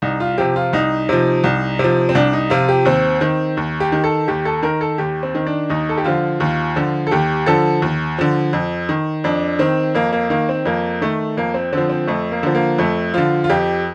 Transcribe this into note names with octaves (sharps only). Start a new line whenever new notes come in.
C2 D#4
F4
C3 F3 G4
F4
C2 D#4
C3 F3
C2
C3 F3
C4
C2 D4
D#4
C3 F3 F4
G4
D#2 C4
D#3 C4
D#2
G4
D#3
A4
D#2 G4
A4
D#3 A#4
A4
D#2 G4
C4
D#3
D4
D#2 D#4
A4
G4
D3 F3 F4
D#2 F4
D3 F3
A4
D#2 G4
D3 F3 A4
D#2
D3 F3
F2
D#3
F2 D4
D#3 C4
F2 A#3
A#3
D#3 A#3
C4
F2 A#3
D#3 A3
F2 A#3
C4
D3 F3 C4
C4
F2 A3
A#3
D3 F3
A#3
F2 A3
D3 F3 F4
F4
F2 G4